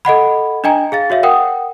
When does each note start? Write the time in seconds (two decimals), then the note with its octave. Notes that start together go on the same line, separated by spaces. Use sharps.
0.05 A4 D#5 F#5 B5
0.64 D4 D#5 G5 G#5 A#5
0.92 G#4 F5 A6
1.10 F#4 C#5 E5 F5
1.23 A#4 F#5 G5 D#6